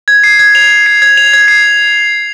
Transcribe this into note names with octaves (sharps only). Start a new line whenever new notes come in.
G#6
C7
G#6
F7
G#6
C7
G#6
F7
G#6
C7